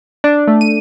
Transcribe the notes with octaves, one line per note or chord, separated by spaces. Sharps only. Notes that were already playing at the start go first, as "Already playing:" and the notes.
D4
A3
D#7